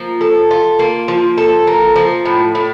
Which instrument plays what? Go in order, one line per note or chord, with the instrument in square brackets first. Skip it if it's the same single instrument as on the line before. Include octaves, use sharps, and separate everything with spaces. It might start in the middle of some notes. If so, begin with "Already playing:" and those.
Already playing: [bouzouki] F3 A#3
A4
F4
A#3
F3
A4
A#3
F3
A2
A2